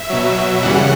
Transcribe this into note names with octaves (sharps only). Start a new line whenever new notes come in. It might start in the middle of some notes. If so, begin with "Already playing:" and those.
Already playing: E5
B2 F#3
F#2 C#3 E3 G3 F#5